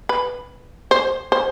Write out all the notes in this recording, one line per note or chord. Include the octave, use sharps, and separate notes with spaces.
B4
C5
C5